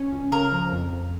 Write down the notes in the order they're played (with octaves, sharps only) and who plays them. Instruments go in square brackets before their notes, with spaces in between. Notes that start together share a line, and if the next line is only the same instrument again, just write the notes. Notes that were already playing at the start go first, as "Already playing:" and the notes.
Already playing: [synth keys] C#4
C#2
[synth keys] C#3 [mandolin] A#4
[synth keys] F3
F2
F2